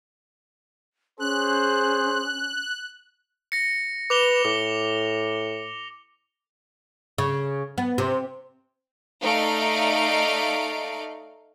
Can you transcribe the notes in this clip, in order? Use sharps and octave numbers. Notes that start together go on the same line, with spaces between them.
C#4 G#4 C5 F#6
A#6 C#7
B4 D6 F7 G7
A2 D6
C#3
B3
C3
A3 D#4 D5 F5 D7